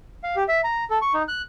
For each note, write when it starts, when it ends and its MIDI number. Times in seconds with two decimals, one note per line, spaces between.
0.24 0.36 77
0.36 0.44 67
0.48 0.61 76
0.64 0.84 82
0.90 0.98 69
1.02 1.13 85
1.13 1.23 63
1.28 1.42 90